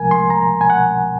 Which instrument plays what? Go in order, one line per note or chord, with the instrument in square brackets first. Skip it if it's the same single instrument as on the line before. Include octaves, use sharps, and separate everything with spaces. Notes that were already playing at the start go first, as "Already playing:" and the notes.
Already playing: [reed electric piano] C2 C3 F3 G#3 A#4 G#5
C6
A#5
G#5
F#5